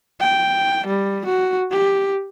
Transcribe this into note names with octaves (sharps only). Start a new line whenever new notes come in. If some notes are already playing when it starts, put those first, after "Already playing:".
G5
G3
F#4
G4